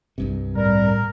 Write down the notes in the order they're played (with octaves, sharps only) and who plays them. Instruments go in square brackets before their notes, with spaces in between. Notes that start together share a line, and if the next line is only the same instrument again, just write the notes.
[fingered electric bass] C2 G2 C3
[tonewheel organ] A2 [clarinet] G3 [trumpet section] A#4